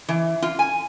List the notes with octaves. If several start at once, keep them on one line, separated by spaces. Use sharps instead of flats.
E3
F4
G#5